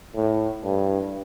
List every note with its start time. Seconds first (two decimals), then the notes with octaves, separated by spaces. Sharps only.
0.16 A2
0.64 G2